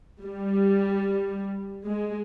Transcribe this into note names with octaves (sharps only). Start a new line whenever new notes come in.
G3
G#3